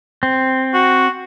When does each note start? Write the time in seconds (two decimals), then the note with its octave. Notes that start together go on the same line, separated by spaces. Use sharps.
0.23 C4
0.74 F#4